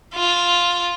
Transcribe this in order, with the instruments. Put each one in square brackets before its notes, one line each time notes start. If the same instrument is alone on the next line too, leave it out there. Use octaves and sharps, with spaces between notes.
[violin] F4